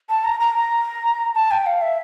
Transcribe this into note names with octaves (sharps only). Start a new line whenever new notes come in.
A5
A#5
A#5
A#5
A5
G5
F5
E5